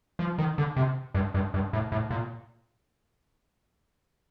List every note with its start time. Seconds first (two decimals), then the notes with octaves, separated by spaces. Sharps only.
0.19 F3
0.38 D#3
0.58 D3
0.76 C3
1.14 G2
1.34 G2
1.54 G2
1.73 A2
1.92 A2
2.10 A#2